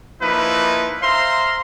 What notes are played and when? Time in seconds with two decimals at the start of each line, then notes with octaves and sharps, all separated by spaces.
0.22 F3 A#3 D#4 E4 B4
1.02 C5 E5 F5 A#5 C6